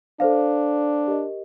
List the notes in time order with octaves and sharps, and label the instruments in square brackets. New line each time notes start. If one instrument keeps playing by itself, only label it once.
[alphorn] D4 [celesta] A4 C5 F5
[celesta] G4 A#4 D#5